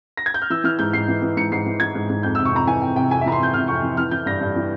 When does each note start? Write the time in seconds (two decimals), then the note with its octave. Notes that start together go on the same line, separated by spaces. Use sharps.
0.17 A#6
0.26 G#6
0.34 G6
0.42 F6
0.50 E3 E6
0.64 E3 F6
0.79 G#2 G6
0.93 G#2 C7
1.08 E3
1.22 E3
1.37 G#2 C#7
1.52 G#2 C7
1.66 E3
1.80 E3 G#6
1.95 G#2
2.09 G#2
2.23 F2 G6
2.35 E6
2.38 C3
2.45 C#6
2.52 F2 A#5
2.67 E3 G#5
2.82 F2 G5
2.96 C3 G5
3.11 F2 G#5
3.21 E5
3.26 E3 A#5
3.32 C6
3.39 F2 G6
3.54 C3 F6
3.68 F2 C#6
3.83 E3
3.97 E3 F6
4.11 E3 G6
4.26 G2 A#6
4.41 G2
4.56 E3